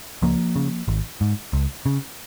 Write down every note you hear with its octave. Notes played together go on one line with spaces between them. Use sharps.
C#2 F3 A#3
C#3
G#1
G#2
C#2
C#3